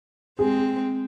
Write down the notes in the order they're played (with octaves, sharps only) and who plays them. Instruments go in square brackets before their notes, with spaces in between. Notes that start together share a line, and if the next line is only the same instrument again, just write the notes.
[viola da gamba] G#3 C4 [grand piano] G#4